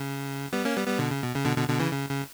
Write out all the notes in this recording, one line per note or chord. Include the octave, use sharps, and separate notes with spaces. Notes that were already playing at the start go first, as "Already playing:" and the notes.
Already playing: C#3
G3 B3
A#3 C#4
G3 B3
G3 B3
B2 D3
C#3
B2
C#3
B2 D3
B2 D3
B2 D3
C#3 E3
C#3
C#3